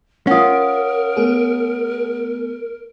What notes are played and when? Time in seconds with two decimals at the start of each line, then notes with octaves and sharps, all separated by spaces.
0.27 C#4 F4 A#4 F#5 D#6
1.17 A3 B3 G#4